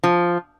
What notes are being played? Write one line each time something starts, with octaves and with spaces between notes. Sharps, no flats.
F3